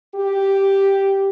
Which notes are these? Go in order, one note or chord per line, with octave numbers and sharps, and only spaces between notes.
G4